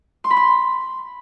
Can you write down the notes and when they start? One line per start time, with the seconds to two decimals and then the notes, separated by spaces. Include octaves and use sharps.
0.24 C6
0.30 B5
0.37 C6